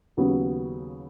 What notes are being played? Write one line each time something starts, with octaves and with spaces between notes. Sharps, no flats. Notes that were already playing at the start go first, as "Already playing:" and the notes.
D#2 C#3 F#3 B3